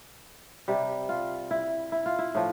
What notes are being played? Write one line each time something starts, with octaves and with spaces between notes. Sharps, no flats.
C3 G3
F4
E4
E4
F4
E4
A2 F3